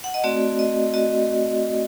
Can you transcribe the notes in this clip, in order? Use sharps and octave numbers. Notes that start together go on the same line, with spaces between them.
F#5
D#5
A3 C4 F#4 D5
D#5
F#4 D#5